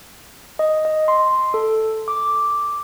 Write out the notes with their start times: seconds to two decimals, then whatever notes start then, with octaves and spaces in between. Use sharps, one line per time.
0.59 D#5
0.85 D#5
1.08 C6
1.54 A4
2.08 D6